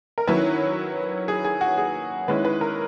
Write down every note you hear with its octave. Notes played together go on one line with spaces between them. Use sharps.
A#4
D#3 F#3 C#4 E4 B4
G#4
G#4
F#4
G#4
D#3 G#3 C#4 E4 B4
B4
A#4